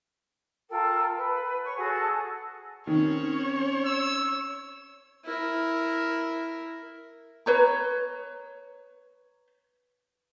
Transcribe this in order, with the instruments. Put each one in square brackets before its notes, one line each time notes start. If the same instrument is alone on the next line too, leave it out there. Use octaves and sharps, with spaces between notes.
[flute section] F4 A4 A#4 G5
B4
C#5 C#6
F#4 G#4 A4 F#5
[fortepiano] D#3 [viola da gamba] C4 C#4 [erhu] C#5
[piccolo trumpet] E6
[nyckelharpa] E4 A#4
[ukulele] B4 C#5 A#5